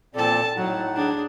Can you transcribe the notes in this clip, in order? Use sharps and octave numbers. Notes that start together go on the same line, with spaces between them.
A#2 C4 A4 D5 A5
A2 F#3 D#4 F#5
D4 G#4